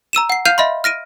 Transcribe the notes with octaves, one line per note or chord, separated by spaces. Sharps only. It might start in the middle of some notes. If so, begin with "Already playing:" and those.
A#5 E6 D#7 E7
F#5 C7
F5 F6 G6 C7 D#7 F7
D#5 E5 B5 C6
F6 A#6 D7 D#7